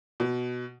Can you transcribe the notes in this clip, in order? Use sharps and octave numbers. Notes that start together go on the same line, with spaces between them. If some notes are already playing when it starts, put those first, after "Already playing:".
B2